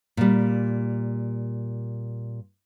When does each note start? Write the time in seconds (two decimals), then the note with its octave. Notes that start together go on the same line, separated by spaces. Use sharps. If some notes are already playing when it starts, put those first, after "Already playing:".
0.17 A#2 G3